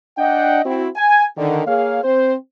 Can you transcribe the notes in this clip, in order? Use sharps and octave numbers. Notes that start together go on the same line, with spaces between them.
D4 D#5 F#5 G5
C4 E4 F#4
G#5
D3 D#3
A#3 G#4 C#5 F5
C4 C5